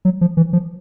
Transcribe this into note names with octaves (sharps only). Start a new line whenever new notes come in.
F#3
F3
E3
F3